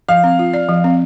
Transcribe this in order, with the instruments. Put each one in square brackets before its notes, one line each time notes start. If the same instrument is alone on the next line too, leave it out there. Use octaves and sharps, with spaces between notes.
[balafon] F3 [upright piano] F5
[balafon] C4
F4
D5
F3
C4